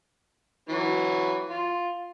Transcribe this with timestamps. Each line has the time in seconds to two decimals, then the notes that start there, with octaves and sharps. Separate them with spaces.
0.69 E3 F#3
1.49 F4